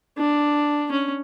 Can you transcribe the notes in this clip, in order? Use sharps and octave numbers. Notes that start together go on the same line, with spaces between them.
D4
C#4